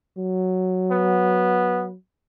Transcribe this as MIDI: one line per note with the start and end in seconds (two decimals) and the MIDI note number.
0.18 1.95 54
0.91 1.86 59